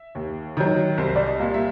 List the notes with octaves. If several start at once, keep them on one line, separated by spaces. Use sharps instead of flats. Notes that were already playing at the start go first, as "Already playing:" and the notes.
Already playing: E5
D#2
D#3 F#3
C2 C5
D5
D#5
A#2 G3 A#3
E5